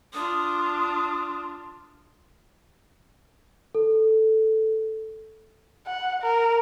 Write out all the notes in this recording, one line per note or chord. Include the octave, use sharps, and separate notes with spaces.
D4 F4 D#6
A4
F#5
A#4